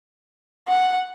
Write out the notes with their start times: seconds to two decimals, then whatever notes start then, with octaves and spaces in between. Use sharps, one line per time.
0.68 F#5